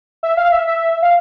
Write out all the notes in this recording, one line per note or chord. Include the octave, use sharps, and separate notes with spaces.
E5
F5
E5
E5
F5